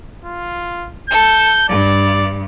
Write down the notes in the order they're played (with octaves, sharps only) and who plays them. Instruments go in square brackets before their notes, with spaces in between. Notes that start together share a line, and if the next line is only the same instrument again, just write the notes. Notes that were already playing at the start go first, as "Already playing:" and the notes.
[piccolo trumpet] F4
[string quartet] A4 [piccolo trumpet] G6
[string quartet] G2 [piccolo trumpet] D5